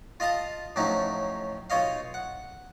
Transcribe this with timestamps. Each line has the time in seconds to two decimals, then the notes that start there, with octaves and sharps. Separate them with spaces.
0.20 F4 D#5 F5 A5 D#6
0.76 F2 A2 F#3 C#4 D#4
1.70 B1 F4 C#5 D#5 F5
2.14 F#5